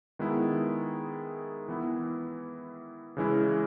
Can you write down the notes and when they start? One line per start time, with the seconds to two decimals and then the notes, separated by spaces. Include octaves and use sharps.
0.19 D#3 G#3 B3 E4
1.68 E3 B3 E4
3.17 C#3 E3 G#3 C#4 E4